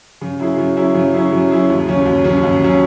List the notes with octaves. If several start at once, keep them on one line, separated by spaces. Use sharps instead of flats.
C#3
F#3 C#4 E4 G#4
C#3
F#3 C#4 E4 G#4
C#3
F#3 C#4 E4 G#4
C#3
F#3 C#4 E4 G#4
D#2
C#3 F#3 C#4
D#2
C#3 F#3 C#4
D#2
C#3 F#3 C#4